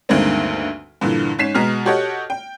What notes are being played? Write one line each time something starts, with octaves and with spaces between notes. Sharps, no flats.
D2 G2 D#3 G#3 A#3 C4
G2 A#2 D3 E3
G#2 C#4 B6 C7 E7
B2 G#3 A#5 F6
F#4 G4 A4 C#5 D#5 F#5
G5